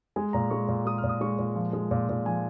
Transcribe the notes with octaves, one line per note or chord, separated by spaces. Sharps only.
G#3 G#5
A#2 A#5
G#3 C#6
A#2
G#3 D#6
F6
A#2
D#6
G#3 C#6
A#2
F3
G#3
A#2
A#2
F3 G#5